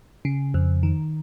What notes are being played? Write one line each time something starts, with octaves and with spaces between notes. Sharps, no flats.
C#3
F2
D#3